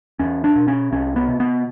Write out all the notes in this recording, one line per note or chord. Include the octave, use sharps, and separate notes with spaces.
E2 C#4
D4
B2
C#4
C2 C#4
B3
C3
B3